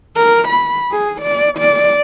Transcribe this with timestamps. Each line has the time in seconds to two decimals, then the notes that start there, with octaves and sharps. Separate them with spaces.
0.16 A#4
0.48 B5
0.91 G#4
1.21 D5
1.58 D5